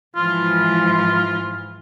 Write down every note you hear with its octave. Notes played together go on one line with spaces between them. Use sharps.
G#2 E3 F3 F4